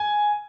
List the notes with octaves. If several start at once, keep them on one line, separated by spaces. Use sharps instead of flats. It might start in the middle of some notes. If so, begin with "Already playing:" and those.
Already playing: G#5